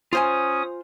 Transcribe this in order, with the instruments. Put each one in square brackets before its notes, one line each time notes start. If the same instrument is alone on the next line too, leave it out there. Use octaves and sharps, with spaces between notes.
[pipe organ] C#4 D#6 [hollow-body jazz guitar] F4 C5 G#5